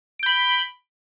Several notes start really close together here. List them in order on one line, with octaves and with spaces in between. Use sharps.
D7 G6 B5